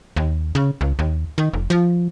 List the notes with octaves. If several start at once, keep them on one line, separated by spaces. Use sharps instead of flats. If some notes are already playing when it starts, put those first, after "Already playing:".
D#2
C#3
C#2
D#2
D#3
F1
F3